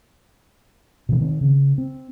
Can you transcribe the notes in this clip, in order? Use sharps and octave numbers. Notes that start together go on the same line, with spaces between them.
B2 E3
D#3 B3 C4
C#3
C4